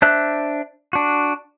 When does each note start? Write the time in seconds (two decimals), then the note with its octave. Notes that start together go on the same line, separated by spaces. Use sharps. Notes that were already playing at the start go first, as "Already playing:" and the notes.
0.02 D4 C5 E5 F#6
0.93 D4 F#4